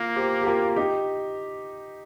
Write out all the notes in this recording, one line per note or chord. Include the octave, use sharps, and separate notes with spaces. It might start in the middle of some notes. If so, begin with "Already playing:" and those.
Already playing: A#3 F4 A#4
G4 C5
G4
F4 A#4
D#4 G4